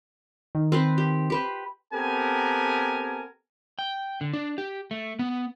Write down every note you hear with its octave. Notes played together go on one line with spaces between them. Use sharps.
D#3
C4 B4 C5
G4
G4 B4 C5
B3 C4 G4 A4 A#4 G#5
G5
D3
D4
G4
A3
B3